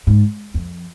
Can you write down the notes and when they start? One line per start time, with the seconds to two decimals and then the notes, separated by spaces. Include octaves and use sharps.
0.07 G#2
0.54 F2